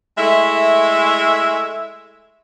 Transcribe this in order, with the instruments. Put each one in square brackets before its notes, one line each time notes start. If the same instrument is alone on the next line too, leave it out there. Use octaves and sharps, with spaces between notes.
[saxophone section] G#3 A3 E4 E5